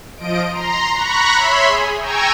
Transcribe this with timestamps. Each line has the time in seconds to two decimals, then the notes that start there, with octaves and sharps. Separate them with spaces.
0.16 F3 D#5 D7
0.50 A#5 C6
0.95 A#5 B5 C#6 F#6 A#6
1.36 C#5 E5 B5 C6
1.66 G#4
2.00 G5 G#5 A#5 C#6 E6 G#6